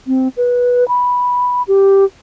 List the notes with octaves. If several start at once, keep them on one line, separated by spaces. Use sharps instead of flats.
C4
B4
B5
G4